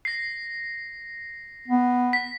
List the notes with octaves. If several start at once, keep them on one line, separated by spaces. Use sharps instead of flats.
A#6 C7
B3
B6